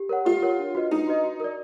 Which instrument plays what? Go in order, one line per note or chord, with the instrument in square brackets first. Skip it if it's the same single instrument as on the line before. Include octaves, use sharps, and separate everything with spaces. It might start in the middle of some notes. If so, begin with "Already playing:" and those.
Already playing: [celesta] G4
A#4 C#5 F#5
[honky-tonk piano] F4 [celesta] G4
[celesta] A#4 C#5 F#5
D4
F#4 B4 D#5
[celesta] D4 [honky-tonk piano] D#4
[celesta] F#4 B4 D#5
F#4
A#4 D5